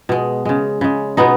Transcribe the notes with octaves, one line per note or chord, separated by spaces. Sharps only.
B2 G#3
C#3 G#3
C#3 G#3
B2 G#3 B3 D#4